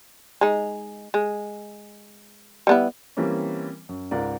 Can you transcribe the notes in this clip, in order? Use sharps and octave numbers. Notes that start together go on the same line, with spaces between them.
G#3 D#4
G#3
G3 B3 E4
E3 G3 A#3 C4 C#4
F#2
C#2 G#2 A#4 D5